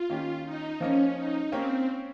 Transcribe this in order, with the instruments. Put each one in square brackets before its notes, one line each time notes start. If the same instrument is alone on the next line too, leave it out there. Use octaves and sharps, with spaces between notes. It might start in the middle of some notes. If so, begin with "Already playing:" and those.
Already playing: [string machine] F4
[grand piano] D#3 A#3 C#4 G4
[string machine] D#4
[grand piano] F3 A#3 F4 A#4 D#5 [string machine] C#4
[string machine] D#4
[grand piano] A#3 C#4 G4 A#4 C#5 [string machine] C4